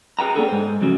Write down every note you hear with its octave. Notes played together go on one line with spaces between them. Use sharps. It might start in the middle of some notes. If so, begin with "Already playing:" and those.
G#4 B4 G5 A#5
A#3 B3 C#4 D4 G#4 A4
G#2 C5
F2 C#3 F#3